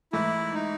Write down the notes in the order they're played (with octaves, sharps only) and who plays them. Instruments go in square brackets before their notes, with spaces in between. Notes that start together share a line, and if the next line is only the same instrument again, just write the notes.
[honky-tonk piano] G#2 E3 A3 [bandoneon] E4
[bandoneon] D#4